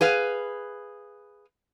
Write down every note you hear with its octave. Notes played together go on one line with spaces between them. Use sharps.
G#4 B4 F5